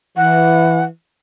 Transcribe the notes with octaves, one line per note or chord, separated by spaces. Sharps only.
E3 F#5